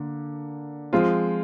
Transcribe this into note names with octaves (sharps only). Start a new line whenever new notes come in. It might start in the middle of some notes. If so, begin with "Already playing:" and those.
Already playing: D3 A#3
F3 G#3 C4 F4